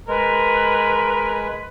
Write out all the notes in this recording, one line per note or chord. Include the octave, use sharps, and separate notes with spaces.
G#3 A#4 B4